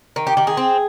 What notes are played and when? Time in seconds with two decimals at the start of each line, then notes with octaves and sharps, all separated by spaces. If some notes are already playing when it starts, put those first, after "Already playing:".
0.16 D#3
0.27 G4
0.37 D#3 G4
0.47 G#4
0.57 C4